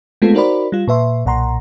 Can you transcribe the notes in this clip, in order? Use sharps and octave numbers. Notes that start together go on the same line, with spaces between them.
G#3 A3 B3 C4 F4 A4
D#4 F#4 A#4 C5 D5 B5
G3 F4
A#2 B4 E5 C6
B1 A#2 F#5 A#5 C6